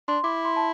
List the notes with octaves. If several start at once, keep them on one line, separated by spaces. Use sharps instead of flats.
D4 C6
E4 D6
C6
A5